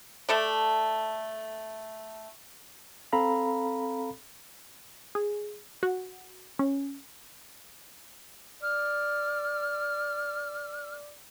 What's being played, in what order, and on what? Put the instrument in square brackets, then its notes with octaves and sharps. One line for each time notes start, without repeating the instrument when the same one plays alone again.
[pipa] A3 A4 D5
[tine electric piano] C4 A4 F5 A#5 B5
[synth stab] G#4
F#4
C#4
[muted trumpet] D5 [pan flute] F6